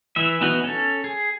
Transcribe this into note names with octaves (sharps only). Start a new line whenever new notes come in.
E3 E4 E5
E3 B3 D#4 F#4
C#4 A4
G#4